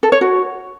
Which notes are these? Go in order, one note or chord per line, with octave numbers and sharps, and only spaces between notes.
A4
C#5
F#4